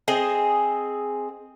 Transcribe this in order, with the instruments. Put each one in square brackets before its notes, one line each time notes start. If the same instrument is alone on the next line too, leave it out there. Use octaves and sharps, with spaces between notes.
[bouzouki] C4 G#4 D#5